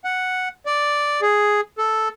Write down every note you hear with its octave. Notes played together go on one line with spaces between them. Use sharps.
F#5
D5
G#4
A4